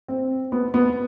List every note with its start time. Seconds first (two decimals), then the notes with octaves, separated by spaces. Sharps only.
0.08 C4
0.52 B3
0.74 B3